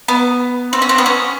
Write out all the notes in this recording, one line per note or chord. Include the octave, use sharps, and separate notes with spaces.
B3
C4
C#4
C4
B3
C#4